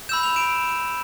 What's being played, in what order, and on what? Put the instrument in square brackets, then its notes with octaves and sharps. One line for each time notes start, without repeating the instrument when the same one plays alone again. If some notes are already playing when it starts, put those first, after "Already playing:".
[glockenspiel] B5 E6 G6 E7
F7
D7 E7